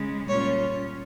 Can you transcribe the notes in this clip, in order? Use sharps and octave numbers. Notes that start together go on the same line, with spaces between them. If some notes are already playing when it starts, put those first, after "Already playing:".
Already playing: C#3 G#3 C#4
A#2 G3 C#4 F4 C#5